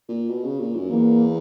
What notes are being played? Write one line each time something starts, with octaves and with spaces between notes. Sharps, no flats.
A#2
B2
C#3
A#2
F#2
E2 A#3